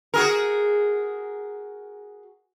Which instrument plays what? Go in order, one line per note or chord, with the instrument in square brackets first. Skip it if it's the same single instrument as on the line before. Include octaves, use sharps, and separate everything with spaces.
[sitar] F#4 G#4 A#4